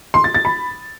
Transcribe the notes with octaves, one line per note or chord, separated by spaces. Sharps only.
C6
A6
A6
B5